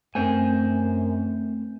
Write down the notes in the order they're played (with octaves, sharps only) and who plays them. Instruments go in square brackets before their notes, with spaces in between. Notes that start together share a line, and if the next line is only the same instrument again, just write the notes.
[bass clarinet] F#2 [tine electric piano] A3 C4 [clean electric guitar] C5 G#5